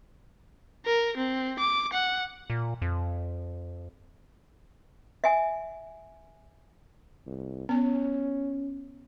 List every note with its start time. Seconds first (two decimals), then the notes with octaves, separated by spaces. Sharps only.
0.86 A#4
1.17 C4
1.59 D6
1.93 F#5
2.50 A#2
2.82 F2
5.24 E5 G#5
7.27 C2
7.69 B3 C#4 G#5